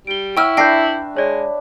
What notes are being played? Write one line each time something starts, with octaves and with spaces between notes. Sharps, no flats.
G3 D7 G7
E4 C#5 F#5 G5 E6 F6
D4 B4 E5 G5 D6 G6 A#6 C7
G#3 C#5 D5